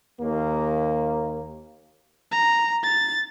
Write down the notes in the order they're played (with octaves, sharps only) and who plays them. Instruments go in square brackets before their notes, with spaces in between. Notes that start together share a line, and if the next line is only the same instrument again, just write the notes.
[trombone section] D#2 A#3
[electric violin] A#5
A6